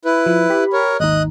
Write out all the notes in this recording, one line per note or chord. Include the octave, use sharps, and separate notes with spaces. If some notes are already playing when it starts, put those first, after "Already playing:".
E4 B4
F3
G4 B5
A#4 C#5
G#1 D#2 D#4 D#5 F#6